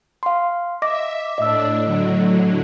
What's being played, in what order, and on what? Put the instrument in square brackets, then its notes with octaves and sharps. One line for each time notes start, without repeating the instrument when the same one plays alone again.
[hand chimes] F5 C6
[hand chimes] D#5 D6 A#6 [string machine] E5
[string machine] A2 D4 [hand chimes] D#5 E6
[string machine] A2 D3 F#3